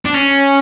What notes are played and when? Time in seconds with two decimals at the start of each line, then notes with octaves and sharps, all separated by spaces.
0.05 D4
0.14 C#4